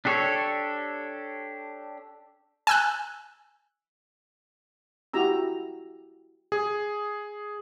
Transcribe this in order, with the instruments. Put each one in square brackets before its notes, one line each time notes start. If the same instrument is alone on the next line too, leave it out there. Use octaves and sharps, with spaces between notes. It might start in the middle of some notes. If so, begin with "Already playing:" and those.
[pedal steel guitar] D4 G4 A4 C#5
[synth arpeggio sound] G#5 E6 F#6
[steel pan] E4 F#4 G4 A#5 E6
[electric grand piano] G#4